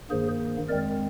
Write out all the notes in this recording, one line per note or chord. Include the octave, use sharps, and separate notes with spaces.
G2 D#3 A#3 G#4 C5
F2 D#3 G#3 C4 A#4 D5